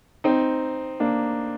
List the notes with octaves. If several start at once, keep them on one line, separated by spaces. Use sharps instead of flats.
C4 D#4
A#3 D4